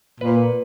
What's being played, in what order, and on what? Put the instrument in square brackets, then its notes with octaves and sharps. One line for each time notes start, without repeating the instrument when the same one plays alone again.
[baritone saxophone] A#2 [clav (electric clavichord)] B4